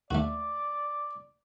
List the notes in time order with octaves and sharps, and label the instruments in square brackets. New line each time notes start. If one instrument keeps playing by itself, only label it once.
[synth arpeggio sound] D#2 D#3 [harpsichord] A3 F#4 [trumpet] D5